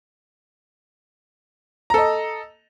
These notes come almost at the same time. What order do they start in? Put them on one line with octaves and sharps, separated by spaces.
A#5 A4 D#5